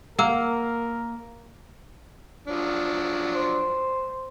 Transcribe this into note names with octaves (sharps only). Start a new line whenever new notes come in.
A#3 A#4 F#5 E6
F3 F#3 D4
C5